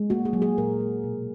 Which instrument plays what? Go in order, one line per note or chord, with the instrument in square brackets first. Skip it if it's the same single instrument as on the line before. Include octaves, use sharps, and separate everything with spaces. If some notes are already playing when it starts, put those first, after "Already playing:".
Already playing: [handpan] G#3
A#3 F#4
G#4
F#3
G#4
A#2 A#4
G#3
B2